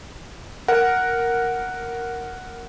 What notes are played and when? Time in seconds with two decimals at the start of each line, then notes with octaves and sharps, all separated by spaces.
0.68 A#4 F#5